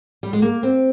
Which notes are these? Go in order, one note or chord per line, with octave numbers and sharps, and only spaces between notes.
G3
G#3
A#3
C4